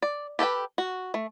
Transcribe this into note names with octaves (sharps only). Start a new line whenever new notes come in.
D5
G4 A4 B4 G5
F#4
A3